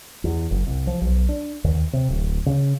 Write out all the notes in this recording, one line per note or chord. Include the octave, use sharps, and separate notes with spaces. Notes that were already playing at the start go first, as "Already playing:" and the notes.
E2
F#1
C2
F3
B1
D4
D#2
C3
D1
C#3